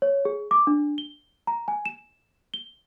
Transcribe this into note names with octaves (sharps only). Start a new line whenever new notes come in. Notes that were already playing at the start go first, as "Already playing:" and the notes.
C#5
G#4
D6
D4
G7
A#5
G#5
E7
G7